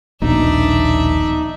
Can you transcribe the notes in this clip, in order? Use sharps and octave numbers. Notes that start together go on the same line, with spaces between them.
D#1 A#1 B2 D4 D#4 E5